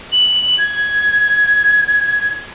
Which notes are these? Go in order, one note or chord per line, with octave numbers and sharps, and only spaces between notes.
F#7
G#6